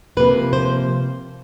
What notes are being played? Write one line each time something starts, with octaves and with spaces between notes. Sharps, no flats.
C3 F3 A#3 B4
C5